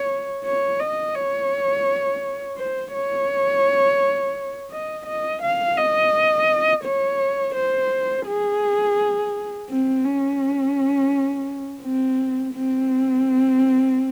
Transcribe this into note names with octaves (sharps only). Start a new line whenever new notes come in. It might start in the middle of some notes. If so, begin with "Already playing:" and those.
Already playing: C#5
C#5
D#5
C#5
C5
C#5
D#5
D#5
F5
D#5
C#5
C5
G#4
C4
C#4
C4
C4